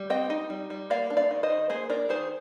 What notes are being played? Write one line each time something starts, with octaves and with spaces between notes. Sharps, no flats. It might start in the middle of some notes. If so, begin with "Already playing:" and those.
Already playing: G3
C4 D#5 G5
D#4
G3
G3
A#3 D5 F5
D4
D5 F5
D#3
C5 D#5
D#3
A#3 G#4 C5
D4 A#4 D5
D#3 G#4 C5